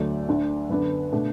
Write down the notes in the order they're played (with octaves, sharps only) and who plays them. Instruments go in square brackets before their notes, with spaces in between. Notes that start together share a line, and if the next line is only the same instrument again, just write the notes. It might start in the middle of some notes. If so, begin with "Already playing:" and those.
Already playing: [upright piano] D2 D3 F#3 A3 D5
D2 D3 A3 D4
F#2 D3 B3 D4 B4
B2 A3 D4